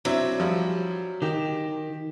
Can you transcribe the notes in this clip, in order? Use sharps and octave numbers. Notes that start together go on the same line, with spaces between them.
F#3 C4 D4 E4
F3 G3
D#3 G4 G5